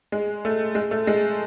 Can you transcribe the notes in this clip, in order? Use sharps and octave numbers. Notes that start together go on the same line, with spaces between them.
G#3
A3
G#3
A3
G#3